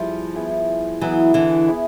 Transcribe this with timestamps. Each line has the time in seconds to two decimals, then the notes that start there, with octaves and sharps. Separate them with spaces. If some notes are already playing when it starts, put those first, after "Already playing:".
Already playing: F3 G3 B3 E4 G#4
0.35 B3 E4 G#4
1.01 E3 F#3 B3 E4 G#4
1.34 D3 E3
1.68 B3 E4 G#4